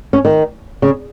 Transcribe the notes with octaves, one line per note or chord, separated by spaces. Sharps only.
C#4
D#3
C#3